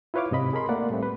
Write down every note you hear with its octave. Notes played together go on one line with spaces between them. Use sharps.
E4 F4 B4 C#5 F5 D6
G#2 C3 D#5 B5
G#4 A#4 B5 C6
A3 A#3 D5 F#5
A2 G3 A3 C4
B4